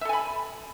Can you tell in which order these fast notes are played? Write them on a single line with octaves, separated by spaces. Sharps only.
E5 A4 G#5 B5